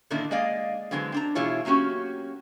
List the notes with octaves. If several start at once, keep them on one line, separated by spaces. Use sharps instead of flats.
A#2 D3 D#3 A#3 D4 E4
G#3 A#3 D5 D#5 F5
D3 E3 F#3 G#3 B3 C4
C4 D4 A#5
B2 E3 E4 F4 G#4 C#5
F#3 A#3 C#4 F#4 G4